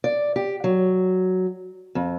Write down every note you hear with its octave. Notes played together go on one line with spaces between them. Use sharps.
D5
G4
F#3
F2